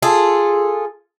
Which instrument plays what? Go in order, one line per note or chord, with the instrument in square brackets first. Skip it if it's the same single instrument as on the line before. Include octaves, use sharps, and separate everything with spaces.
[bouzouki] F4 G#4 A4